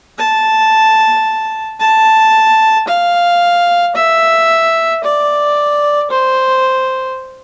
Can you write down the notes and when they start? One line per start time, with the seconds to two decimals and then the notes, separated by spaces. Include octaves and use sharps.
0.18 A5
1.80 A5
2.88 F5
3.96 E5
5.04 D5
6.11 C5